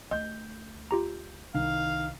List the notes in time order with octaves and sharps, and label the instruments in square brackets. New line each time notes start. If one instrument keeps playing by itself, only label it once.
[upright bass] D2 [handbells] D#5 [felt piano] G6
[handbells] F4 G4 A#5
[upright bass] C2 [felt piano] D#3 [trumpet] F5